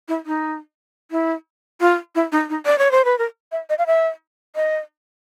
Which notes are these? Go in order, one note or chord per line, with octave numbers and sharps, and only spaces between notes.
E4
D#4
E4
F4
E4
D#4
D#4
D5
C#5
C5
B4
A#4
E5
D#5
F5
E5
D#5